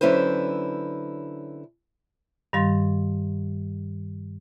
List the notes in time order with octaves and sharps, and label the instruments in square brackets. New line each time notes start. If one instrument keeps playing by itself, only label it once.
[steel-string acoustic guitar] D3 F#3 C#4 E4 B4 C5
[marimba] G2 D#3 G3 F5 C6 A6